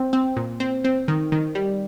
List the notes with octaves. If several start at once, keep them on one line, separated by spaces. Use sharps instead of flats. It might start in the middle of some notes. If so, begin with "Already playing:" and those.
Already playing: C4
C4
A#2
C4
C4
D#3
D#3
G3